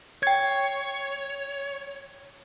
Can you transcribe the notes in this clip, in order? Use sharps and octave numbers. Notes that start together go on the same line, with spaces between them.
C#5 G5 G#6